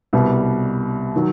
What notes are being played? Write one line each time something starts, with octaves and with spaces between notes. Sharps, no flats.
C2 B2 G3
D#3 F#3